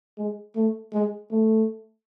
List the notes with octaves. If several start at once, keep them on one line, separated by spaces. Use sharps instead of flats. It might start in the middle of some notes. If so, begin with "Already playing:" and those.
G#3
A3
G#3
A3